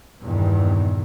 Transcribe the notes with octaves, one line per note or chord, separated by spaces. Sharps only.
E2 G2 A#2 D#3 E3